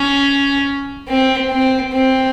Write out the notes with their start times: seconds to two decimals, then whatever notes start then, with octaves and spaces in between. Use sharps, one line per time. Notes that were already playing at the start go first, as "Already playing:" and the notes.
Already playing: C#4
1.09 C4
1.51 C4
1.93 C4